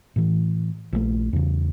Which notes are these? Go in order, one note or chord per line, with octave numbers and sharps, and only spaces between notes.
A2 E3
A#1 D#3 A3
E2 C#3